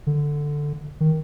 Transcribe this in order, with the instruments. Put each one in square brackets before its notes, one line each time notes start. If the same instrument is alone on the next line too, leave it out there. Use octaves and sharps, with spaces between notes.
[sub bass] D3
D#3